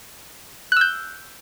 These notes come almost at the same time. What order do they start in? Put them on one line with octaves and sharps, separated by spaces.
F#6 E6 G6